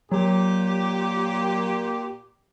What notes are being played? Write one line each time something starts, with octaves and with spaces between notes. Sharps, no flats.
A#2 F#3 G4